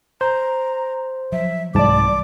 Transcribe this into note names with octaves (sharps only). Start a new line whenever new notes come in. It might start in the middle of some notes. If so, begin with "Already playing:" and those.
C5 A#5
F3 F#3 E5
C2 G#2 E3 F#3 A3 D5 A5 D6